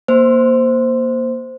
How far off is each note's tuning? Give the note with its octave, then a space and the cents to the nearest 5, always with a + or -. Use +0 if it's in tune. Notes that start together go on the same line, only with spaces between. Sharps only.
A#3 +10 C5 -5